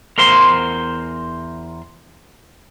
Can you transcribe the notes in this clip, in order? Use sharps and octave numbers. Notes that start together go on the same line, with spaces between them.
E2 A#4 C5 C6